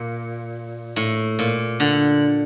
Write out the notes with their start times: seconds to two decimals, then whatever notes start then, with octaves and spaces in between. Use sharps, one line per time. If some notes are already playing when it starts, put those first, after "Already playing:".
Already playing: A#2
0.96 A2
1.39 A#2
1.80 D3